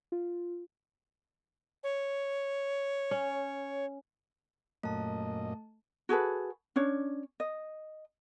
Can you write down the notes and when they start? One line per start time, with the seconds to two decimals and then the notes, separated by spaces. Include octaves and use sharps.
0.12 F4
1.84 C#5
3.11 C#4
4.83 F#2 A#2 A3 D#5 A5
6.09 F#4 G#4 A4 B4
6.76 C#4 D4 C#5
7.40 D#5